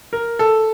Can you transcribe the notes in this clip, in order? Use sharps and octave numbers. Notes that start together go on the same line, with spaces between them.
A#4
A4